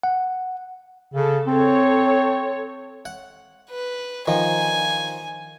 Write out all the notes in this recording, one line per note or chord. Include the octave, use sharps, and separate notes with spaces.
F#5
C#3 A4
C4 A4 C#5
F#5
B4
D#3 F3 G#5